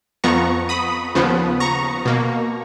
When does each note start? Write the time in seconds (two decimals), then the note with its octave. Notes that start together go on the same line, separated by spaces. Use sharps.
0.24 F2 F3 B3 A#5 C#6
0.69 B5 D#6
1.15 D#2 C#3 F3 B3
1.60 A#5 C#6
2.05 B2 A#3